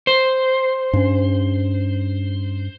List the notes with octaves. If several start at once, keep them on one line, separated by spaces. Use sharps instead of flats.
C5
G2 C#4